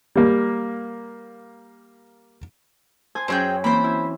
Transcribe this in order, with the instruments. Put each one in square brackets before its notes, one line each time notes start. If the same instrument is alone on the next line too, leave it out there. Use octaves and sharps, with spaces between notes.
[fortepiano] G3 A#3
[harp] C5 G#5 D#6
[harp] F#2 C#4 G#5 [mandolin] C4 G#4 G5
[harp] E3 A#3 C4 [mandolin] C5 B5
[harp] E4